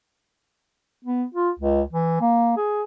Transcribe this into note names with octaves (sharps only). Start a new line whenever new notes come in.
B3
F4
C#2
E3
A#3
G#4